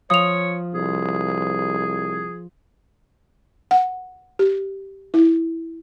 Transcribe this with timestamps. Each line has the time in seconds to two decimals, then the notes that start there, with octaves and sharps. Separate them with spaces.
0.10 F3 C#5 D#6 F7
0.74 C2 G#4
3.71 F#5
4.39 G4
5.14 E4